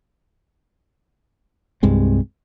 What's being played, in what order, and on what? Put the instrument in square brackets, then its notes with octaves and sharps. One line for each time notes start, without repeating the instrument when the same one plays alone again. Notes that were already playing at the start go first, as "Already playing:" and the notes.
[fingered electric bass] C2 G2 G#3 C4